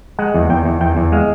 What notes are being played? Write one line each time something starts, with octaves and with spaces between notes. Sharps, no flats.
G#3 F#5
E2
E2 G5
E2
E2 G5
E2
G#3 F5